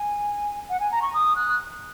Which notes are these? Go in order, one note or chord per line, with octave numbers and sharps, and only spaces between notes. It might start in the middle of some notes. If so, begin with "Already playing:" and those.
Already playing: G#5
F#5
G#5
A#5
C#6
D#6
F#6